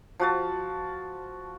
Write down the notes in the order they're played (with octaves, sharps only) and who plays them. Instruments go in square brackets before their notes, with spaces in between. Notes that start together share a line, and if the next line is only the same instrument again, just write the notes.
[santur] F3 F#4 A5